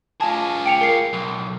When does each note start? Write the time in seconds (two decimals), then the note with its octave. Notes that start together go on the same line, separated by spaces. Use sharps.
0.21 F4 G#4 A5
0.66 G5 C#7 F7
0.81 A#4 C7
1.13 B1